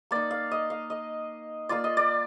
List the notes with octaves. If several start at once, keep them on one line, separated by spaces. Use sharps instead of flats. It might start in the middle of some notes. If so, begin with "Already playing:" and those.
A#3 D#4 D5
F5
D#5
F5
D#5
A#3 F4 D5
D#5
D5